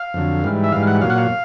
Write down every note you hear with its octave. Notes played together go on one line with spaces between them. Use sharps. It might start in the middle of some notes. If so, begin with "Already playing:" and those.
Already playing: F5
F2 D3 F#3
G#2 E3 G3
E5
G#2 E3 G3 F5
F#5
A#2 F#3 F5
F#5
F5